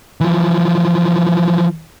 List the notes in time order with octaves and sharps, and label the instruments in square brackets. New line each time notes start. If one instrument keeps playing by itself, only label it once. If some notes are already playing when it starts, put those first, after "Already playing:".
[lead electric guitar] E3 F3